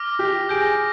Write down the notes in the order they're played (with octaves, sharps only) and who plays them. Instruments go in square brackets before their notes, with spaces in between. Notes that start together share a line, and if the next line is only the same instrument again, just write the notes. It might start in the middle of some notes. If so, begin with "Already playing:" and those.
Already playing: [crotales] D6 F6 A#6
[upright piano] G4
[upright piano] G#4 [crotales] G6 A#6 D7